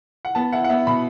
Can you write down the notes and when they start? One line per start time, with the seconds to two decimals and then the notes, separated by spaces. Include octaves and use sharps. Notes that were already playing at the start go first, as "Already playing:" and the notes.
0.25 F#5
0.35 B3 A5
0.53 E4 F#5
0.64 F#5
0.70 B3 E5
0.87 B2 B5